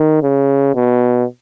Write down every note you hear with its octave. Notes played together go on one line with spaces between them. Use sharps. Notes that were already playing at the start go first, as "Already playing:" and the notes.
Already playing: D#3
C#3
B2